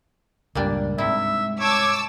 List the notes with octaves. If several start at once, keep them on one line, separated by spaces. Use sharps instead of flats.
C#2 G2 A#2 G3 D4
G#2 C3 E4 E5
C#5 A5 D6 E6